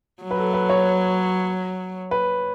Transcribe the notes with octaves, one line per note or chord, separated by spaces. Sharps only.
F#3
B4
A4
B4
C#5
B4